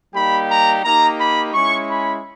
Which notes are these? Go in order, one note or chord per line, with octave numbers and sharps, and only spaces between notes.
G3 A#3 D#4 G4 B5
A#5
A#3 D#4 G4 A#5
B5
G#3 C#4 E4 C#6
B5